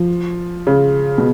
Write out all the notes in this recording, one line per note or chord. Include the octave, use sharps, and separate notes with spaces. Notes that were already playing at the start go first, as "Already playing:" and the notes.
Already playing: F3
C#3
B2